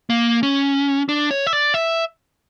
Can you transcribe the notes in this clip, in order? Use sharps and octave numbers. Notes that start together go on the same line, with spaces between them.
A#3
C#4
D4
C#5
E5
D5
E5